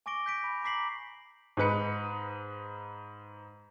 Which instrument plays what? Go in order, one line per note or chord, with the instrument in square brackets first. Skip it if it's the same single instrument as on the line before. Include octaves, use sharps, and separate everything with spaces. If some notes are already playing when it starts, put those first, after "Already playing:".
[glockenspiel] G#5 C#6 D6 A#6 D7 G7
G6 B6 D7
B5
A#5 D6 B6 C7 F#7
[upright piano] G#2 D#4 B4 C#7